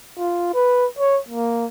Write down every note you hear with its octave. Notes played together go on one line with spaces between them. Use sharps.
F4
B4
C#5
A#3